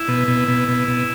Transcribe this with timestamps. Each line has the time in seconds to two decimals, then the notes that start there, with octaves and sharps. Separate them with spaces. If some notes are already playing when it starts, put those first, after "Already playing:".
Already playing: E4
0.08 B2
0.28 B2
0.48 B2
0.68 B2
0.88 B2